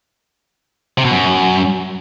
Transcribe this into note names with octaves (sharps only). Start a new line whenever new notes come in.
C3
B2
F#2